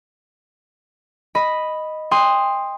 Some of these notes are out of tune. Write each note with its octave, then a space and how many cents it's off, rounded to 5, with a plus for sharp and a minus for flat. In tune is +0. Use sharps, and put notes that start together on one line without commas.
D#5 +0 B5 +0
G5 +35 C6 +0 D#6 +0